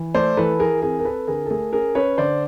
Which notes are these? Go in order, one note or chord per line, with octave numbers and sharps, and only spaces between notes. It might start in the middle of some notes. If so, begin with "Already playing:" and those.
Already playing: E3
A3 C5 D5
E3 A4 B4
E3 G#4 A#4
C4 G#4 A#4
A#4
C4 A4 B4
D3 G#4 A#4
A4
A3 G#4 A#4
C#4 G#4 A#4
C#4 B4 C#5
D3 C5 D5